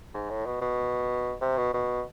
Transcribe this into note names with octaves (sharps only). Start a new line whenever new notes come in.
G#2
A2
B2
B2
C3
B2
B2